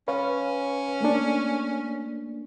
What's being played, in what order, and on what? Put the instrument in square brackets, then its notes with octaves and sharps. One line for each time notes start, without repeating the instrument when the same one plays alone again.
[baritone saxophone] C#4 [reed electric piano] B4 C#5 F5
[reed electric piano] A3 A#3 D4